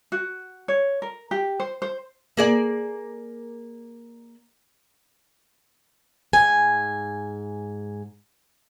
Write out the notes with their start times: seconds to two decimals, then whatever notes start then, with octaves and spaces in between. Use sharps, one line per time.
0.12 F#4
0.68 C#5
1.02 A#4
1.31 G4
1.60 C5
1.82 C5
2.37 A#3 G#4 D5
6.33 G#2 G#5